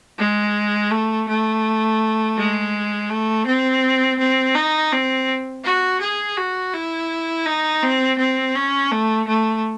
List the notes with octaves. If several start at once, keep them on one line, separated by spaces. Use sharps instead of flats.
G#3
A3
A3
G#3
A3
C4
C4
D#4
C4
F#4
G#4
F#4
E4
D#4
C4
C4
C#4
A3
A3